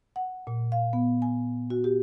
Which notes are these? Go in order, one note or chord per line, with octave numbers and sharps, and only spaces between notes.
F#5
A#2
F5
B3
G#5
F#4
G4